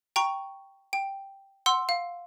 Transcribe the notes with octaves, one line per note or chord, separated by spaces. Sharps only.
G5 A#5 C#6
G5
F#5 C6 E6
F5